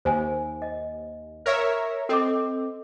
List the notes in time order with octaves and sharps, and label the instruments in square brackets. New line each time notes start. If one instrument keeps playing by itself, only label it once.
[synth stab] D#2 [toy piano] C5 G#5
[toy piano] D#5
[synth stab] A#4 C#5 E5
[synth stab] C4 [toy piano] A4 D#5 D6